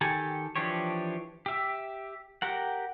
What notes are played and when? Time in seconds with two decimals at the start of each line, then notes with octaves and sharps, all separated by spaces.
0.01 D#3 G4 A4 G#5
0.56 E3 F3 D4 G4 C#5
1.46 G4 E5
2.42 G4 A#4 F#5